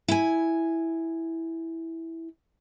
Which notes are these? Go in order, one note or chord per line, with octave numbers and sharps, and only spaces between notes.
E4 G#5